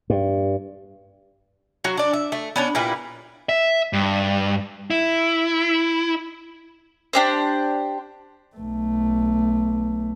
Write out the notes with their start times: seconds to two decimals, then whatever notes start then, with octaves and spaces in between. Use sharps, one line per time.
0.10 G2
1.84 F#3 F#4
1.97 D4 D5
2.13 E5
2.32 A3
2.56 B3 C#4 D4
2.75 A#2 G3 E4 B4
3.49 E5
3.93 G2
4.90 E4
7.13 D4 G4 C5
8.57 B1 A3